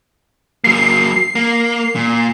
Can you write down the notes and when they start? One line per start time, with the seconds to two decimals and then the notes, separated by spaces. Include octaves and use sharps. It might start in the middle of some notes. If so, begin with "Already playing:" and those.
0.64 F#3 A#3 C7
1.35 A#3
1.95 A#2